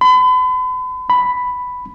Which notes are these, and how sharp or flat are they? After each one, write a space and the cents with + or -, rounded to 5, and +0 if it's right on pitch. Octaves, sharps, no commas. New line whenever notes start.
B5 +40
B5 +5